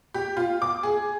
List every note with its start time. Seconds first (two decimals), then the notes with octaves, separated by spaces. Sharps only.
0.14 G4
0.37 F4
0.62 D6
0.83 G#4